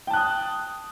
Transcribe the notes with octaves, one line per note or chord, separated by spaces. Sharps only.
G5 A5 D#6 F#6